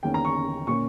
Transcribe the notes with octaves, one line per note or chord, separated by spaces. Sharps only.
E2 D#3 A#3 C#4 G5
A#5
C#6
A#2 A#3 C#4 C#6